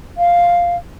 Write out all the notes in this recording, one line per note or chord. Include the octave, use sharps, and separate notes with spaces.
F5